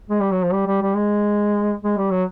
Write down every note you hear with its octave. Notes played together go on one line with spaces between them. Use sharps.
G#3
G3
F#3
F3
G3
G3
G3
G#3
G#3
G3
F#3